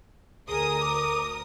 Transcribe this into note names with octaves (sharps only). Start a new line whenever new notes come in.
D2 G#4 A#4 D#6
D6